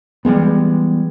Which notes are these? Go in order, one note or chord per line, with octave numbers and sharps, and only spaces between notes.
E3 G3 G#3 B3